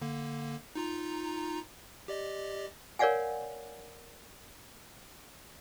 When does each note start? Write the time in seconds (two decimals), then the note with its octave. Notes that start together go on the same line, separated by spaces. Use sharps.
0.01 D3 A#3
0.75 D#4 F4 A#5
2.08 G4 D5 D#5
2.99 A#4 C#5 D5 F5 F#5 G#5